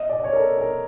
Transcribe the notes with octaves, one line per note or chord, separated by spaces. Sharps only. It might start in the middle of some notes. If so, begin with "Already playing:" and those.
Already playing: D#5
D5
D5
C#5
A#4
A4
A#4